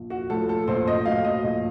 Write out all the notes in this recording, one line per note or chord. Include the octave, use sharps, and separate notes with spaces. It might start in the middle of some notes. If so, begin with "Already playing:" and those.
Already playing: A#1
F#4
A2 F3 A4
A4
A#1 C5
D#5
A2 F#3 F5
D#5
A#1